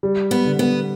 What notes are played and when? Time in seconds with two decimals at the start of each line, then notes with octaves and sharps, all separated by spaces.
0.03 G3
0.31 B3
0.45 D3
0.59 B3